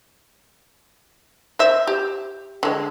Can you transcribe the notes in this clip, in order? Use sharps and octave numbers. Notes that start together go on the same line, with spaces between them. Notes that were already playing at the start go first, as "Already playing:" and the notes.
C5 E5
G4
D3 G#3